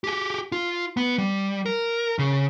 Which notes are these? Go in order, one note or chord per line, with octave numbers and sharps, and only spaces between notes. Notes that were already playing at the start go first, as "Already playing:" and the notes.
G4 G#4
F4
B3
G3
A#4
C#3